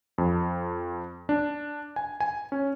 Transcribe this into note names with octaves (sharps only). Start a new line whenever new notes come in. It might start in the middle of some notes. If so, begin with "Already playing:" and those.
F2
D4
G#5
G#5
C#4